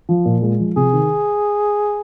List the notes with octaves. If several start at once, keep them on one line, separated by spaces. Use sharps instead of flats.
F3
A#2
G#3
F3
C3 G#4
D#3